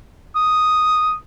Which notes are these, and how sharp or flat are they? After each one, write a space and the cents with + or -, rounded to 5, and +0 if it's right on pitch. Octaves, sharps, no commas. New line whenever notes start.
D#6 +0